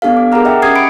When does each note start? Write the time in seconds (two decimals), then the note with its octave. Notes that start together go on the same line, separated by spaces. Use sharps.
0.02 B3 D4 G4 A4 F5
0.17 D6
0.32 G#4 A#4 F#5 A#5 F6
0.45 D#5 E5 F#5 G5
0.62 C#4 G4 D6 D#6 G#6 C7
0.75 B5 C#7 D7